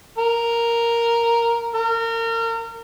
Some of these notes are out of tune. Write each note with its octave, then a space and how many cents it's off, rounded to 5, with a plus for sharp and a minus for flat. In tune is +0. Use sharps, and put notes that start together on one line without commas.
A#4 +0
A#4 -30